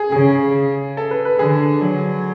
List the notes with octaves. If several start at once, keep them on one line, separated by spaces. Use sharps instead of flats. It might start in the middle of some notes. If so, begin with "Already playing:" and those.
Already playing: G#4
C#3 G#4
A4
B4
B4
D3 G#4
F#3